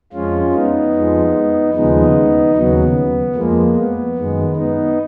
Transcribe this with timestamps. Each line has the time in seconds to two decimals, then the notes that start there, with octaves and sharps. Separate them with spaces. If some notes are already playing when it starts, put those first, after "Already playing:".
0.13 F2 F3 G#3 C#4 F4
0.54 B3 D#4
0.93 F2 F3 G#3
1.74 D#2 C#3 F3 G#3 B3 D#4
2.55 D#2 C#3 F#3 B3
3.35 F2 F3 G#3 A#3
3.76 B3
4.16 F#2 D#3 G#3
4.56 B3 D#4